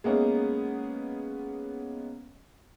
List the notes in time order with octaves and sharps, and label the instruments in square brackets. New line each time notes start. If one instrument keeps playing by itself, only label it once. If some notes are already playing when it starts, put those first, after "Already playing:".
[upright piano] G#3 A#3 B3 C#4 D#4